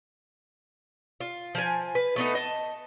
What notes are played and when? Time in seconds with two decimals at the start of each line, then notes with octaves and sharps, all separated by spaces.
1.20 F4
1.55 F3 G#5
1.95 B4
2.16 A3 B3 D#4
2.35 D#5 A5